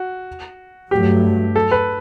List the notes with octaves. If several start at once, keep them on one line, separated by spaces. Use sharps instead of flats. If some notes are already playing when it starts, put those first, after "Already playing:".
Already playing: F#4
G2 F#3 A3 G4
A4
B4